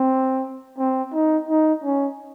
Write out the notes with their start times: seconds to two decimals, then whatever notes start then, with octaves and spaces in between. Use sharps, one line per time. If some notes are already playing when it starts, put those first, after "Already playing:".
Already playing: C4
0.78 C4
1.13 D#4
1.48 D#4
1.84 C#4